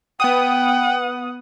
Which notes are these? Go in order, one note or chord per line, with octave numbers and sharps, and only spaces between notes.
B3 F#5 G5 D#6